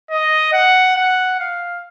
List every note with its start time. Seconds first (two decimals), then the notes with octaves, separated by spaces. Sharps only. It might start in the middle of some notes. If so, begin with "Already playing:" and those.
0.10 D#5
0.53 F#5
0.96 F#5
1.40 F5